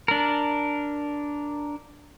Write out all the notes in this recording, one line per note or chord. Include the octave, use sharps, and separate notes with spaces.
D4 A#4